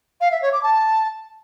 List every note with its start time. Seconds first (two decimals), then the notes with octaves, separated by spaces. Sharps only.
0.21 F5
0.31 E5
0.42 C#5
0.53 D6
0.63 A5